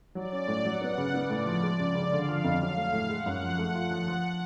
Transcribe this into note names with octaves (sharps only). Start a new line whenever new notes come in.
F#3 D5
C#4
A2
F#3 F#5
B3
C#3
B3 D5
A2
F3
G#3
C#2
C#3
D3 F5
F3
F2
F#3 F5
A3
A2
G#3 F#5
F#2
F3
A3
F4
F3
F3